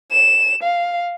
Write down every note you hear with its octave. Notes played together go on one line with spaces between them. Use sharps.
E7
F5